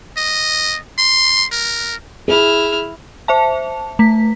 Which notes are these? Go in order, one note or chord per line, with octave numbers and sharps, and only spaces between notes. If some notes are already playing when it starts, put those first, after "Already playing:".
D#5
C6
A#4
E4 G#4 F6
C5 E5 A5
A3 B6